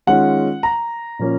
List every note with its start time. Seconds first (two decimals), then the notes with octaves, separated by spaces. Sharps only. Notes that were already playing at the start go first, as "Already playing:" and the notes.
0.07 D#3 G#3 C#4 F4 F#5
0.63 A#5
1.19 A#2 F3 A#3 C#4 F4